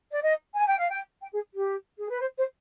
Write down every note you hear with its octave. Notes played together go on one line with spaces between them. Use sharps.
D5
D#5
G#5
G5
F5
G5
G5
G#4
G4
G#4
B4
C5
C5